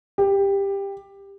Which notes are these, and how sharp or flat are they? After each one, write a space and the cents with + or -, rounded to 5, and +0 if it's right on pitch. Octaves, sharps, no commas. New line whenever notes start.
G4 +15